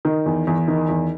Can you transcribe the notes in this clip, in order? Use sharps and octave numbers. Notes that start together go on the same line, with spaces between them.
D#3
E2
E2
D#3
E2